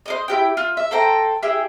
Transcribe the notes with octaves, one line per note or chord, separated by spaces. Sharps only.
C5 D5 D#5
E4 G4 G5
F4
E5
A4 C5 G5 A#5
E4 G4 G#4 E5